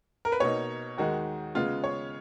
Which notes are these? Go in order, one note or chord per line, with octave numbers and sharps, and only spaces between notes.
A#4
B4
B2 A#3 D#4 C#5
D#2 D#3 G#3 D#4 F#4
C#3 G#3 B3 F4
C#5